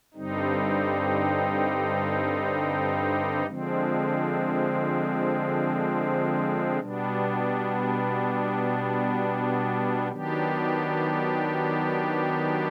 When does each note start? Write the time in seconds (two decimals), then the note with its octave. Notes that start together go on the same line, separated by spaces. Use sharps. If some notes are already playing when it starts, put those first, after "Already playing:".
0.14 G2 D3 G3 C4 D#4
3.46 D3 F3 G#3 C4
6.79 B2 G3 B3 D4
10.11 D#3 F#3 B3 D4 G4